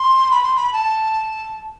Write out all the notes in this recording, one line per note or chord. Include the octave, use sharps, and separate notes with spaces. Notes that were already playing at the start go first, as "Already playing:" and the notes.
Already playing: C6
B5
C6
B5
A5